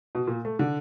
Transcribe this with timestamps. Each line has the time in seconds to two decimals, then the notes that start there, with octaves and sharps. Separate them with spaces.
0.15 B2
0.27 A#2
0.45 A3
0.59 D3